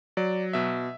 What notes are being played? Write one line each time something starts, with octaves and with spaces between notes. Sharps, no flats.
F#3 D5
B2 E5